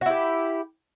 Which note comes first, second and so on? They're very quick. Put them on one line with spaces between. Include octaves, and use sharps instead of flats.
F#4 E4 G4